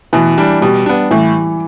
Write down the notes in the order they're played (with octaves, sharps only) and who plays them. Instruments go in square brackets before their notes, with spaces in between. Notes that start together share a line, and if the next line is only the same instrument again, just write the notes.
[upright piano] B2 [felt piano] E3
[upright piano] G3 D4
[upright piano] B2 [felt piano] G3
[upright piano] B3 D4
[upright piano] A2 [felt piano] E3